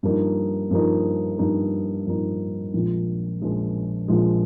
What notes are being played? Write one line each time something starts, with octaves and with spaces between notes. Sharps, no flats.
G2 F3 A#3 D#4
G2 F3 A#3 D#4
G2 F3 A#3 D#4
G2 F3 A#3 D#4
A#1 A#2 F3 G#3
A#1 A#2 F3 G#3
A#1 A#2 F3 G#3